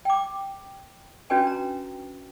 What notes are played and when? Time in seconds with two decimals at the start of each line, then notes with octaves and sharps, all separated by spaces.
0.05 G5 D6
1.30 C#4 D4 F#4 B4 G5 G#5
1.47 A#5